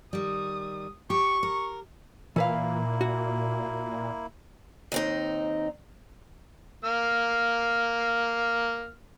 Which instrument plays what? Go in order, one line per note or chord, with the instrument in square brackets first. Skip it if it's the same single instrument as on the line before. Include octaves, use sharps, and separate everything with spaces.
[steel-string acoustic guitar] D#3 G3 [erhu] D#6
[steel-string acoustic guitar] G4 [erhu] C#6
[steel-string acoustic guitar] A#4
[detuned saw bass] A#2 [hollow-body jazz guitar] E3 B4 F5 [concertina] A#3 E4
[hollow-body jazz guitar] F#4
[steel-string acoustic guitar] D#2 C4 D#4
[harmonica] A#3 F6